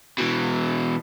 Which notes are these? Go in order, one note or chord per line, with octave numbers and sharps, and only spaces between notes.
B2 E3